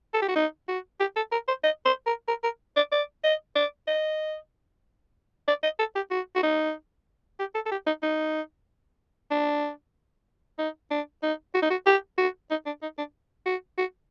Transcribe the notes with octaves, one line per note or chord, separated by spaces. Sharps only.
A4
G4
F#4
D#4
F#4
G4
A4
A#4
C5
D#5
C5
A#4
A#4
A#4
D5
D5
D#5
D5
D#5
D5
D#5
A4
G4
F#4
F#4
D#4
G4
A4
A4
G4
D#4
D#4
D4
D#4
D4
D#4
F#4
D#4
F#4
G4
F#4
D#4
D4
D#4
D4
F#4
F#4